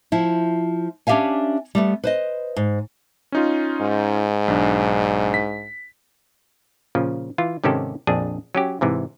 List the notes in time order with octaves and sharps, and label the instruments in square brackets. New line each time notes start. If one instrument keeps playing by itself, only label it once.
[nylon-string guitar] F3 E4
C#4 D4 G4 E5 F5 G#5
G3 A3 B3
B4 C5 D#5
G#2
[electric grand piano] C#4 D#4 F4
[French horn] G#2
[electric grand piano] B1 D4
B6
[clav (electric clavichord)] A#2 C#3 F3
E3 F4
G#2 C3 D#3 C#4 G4 A4
A#1 F2 D4 G#4
F#3 C#4 G4
G#2 C3 E3